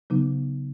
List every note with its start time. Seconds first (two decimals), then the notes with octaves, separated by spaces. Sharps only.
0.10 C#3 F#3 B3 D#4